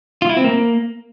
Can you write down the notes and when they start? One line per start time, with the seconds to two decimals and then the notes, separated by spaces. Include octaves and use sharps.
0.22 F4
0.29 E4
0.37 C4
0.44 A#3